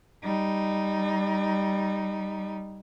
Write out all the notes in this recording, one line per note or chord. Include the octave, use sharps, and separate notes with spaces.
G3 D#4